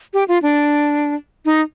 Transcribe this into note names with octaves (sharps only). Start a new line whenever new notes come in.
G4
F4
D4
D#4